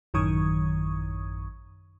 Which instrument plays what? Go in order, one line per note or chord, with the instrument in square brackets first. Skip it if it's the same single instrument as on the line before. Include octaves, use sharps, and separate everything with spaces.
[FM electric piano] A1 F#2 D#3 C#6 D#6 G#6